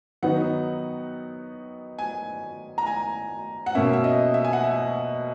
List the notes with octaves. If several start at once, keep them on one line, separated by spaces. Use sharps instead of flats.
D#3 F#3 B3 D#4 F#5
G#5
A#5
G#5
F#5
B2 A#3 C#4 E5
E5
D#5
E5
G#5
F#5
E5